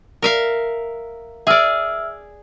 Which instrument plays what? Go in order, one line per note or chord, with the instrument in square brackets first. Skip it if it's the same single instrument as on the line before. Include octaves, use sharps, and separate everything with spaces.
[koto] A#4 E5 F5
[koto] G#4 D5 [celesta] E5 E6 F6